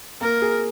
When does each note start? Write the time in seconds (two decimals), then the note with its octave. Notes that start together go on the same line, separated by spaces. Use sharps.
0.21 A#3 A#4
0.42 G#4